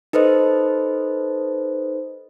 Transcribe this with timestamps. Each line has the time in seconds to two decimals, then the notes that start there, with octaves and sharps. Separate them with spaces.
0.13 D#4 A4 B4 C5 D#5